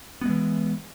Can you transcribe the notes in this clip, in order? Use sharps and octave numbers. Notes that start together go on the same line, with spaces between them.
E3 G#3 B3